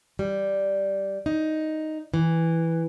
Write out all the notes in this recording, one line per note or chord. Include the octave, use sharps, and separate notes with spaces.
G3
D#4
E3